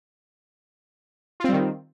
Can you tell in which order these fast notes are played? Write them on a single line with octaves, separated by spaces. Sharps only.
F4 C4 G3 D#3